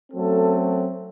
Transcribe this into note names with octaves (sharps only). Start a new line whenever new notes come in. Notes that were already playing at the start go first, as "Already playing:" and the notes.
F#2 F#3 A3 C4 A4